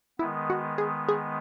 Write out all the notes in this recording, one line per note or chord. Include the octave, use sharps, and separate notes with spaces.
D#3 G#3 B3 E4
F#4
G#4
G#4